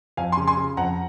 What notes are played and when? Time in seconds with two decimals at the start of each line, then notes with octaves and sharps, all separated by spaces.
0.17 F2 F5 G#5
0.32 G#5 C6
0.37 C#3
0.47 G#5 C6
0.57 C#3
0.77 F2 F#5 A#5